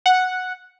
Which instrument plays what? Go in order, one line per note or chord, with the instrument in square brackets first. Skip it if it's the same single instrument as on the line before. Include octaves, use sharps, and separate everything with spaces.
[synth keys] F#5